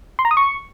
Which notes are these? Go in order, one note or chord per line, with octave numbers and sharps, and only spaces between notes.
C6
A#5
D#6
C#6